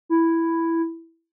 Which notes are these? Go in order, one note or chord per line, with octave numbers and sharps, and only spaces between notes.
E4